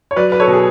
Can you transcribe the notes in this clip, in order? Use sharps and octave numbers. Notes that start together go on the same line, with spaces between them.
C#5
F#3 B4 D5
B4
A4 C#5
B2
G#4